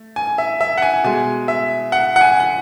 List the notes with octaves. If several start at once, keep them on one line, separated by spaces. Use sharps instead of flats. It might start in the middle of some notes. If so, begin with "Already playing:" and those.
Already playing: A3
G#5
E5
E5
F#5
G#5
B2 G#3 G#5
E5
F#5
F#5
G#5
F#5